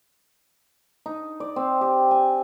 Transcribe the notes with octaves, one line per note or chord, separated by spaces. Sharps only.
D#4
D5
C4
G4
G#5